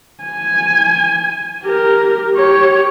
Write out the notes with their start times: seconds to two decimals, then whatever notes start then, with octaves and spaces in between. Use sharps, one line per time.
0.24 G#5
1.63 G4 A#4
2.33 G4 C#5